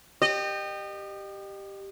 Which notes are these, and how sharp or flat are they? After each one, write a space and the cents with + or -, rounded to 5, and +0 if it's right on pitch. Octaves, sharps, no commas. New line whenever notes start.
G4 +0 D#5 -35